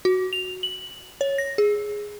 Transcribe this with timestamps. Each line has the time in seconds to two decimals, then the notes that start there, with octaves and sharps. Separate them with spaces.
0.05 F#4
0.33 F7
0.63 F#7
1.21 C#5
1.38 A#6
1.58 G#4